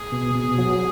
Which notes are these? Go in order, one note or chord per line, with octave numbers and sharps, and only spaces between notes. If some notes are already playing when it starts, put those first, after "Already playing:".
Already playing: G#4
B2
B2
F#3